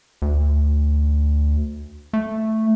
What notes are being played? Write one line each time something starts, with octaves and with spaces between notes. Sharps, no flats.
D2
A3